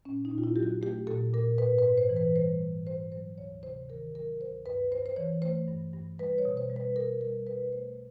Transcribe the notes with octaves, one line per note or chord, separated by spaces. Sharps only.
A#2 C#4
D#4
A#2
F4
E4
F#3 G4
F#4
A3 G4
A#2 A4
A#2 A#4
G#2 B4
B4
G#2
C5
E3
B4
G3 C5
G#2
G#2 C5
F#3 C5
D2 C#5
C3 C5
D#3 A#4
F#3 A#4
D2 C5
G2 B4
G2 C5
C5
E3 C#5
A3 C5
G2
G2
G3 B4
C#5
B2
C5
G3
B4
B2 A#4
G3 A#4
B2 B4
A3 C5